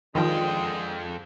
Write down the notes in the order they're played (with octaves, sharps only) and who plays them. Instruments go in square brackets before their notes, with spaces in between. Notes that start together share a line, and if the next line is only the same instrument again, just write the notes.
[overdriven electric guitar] F2 G5 [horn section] D3 G#3 [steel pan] D#3 F3